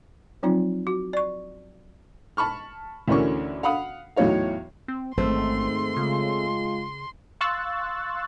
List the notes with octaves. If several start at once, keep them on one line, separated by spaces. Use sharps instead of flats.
F3 F#3 C4 D#4 F4
F#4
D5 C#6
A5 B5 C#6 F6
D2 D3 E3 C#4 A#4 C#6
F5 F#5 B5 D#6
E2 A2 F#3 D#4 C#5 F5
C4
A1 G#2 D#3 A3 C4 C5 C6
C#3 G#3 F4
F5 C6 C#6 E6 F#6 A6